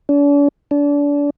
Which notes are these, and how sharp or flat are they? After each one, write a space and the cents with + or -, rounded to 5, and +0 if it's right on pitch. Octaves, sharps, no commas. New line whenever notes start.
D4 -45
D4 -30